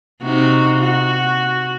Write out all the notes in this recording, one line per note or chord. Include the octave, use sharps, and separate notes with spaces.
C3 D#4 F#4
F#4